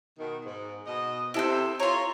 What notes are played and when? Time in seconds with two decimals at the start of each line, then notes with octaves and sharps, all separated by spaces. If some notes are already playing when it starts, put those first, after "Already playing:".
0.18 B2 D#3
0.45 G#2
0.86 B2 D#5
1.34 C3 E4 A4 C5
1.80 F4 C#5 A#5 C6